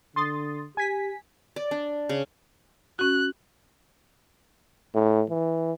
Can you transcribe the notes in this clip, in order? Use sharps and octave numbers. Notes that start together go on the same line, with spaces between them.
D3 C6 D#6 A6
G4 G#5 B6
D5
D4
C#3
C#4 F#4 F#6
A2
E3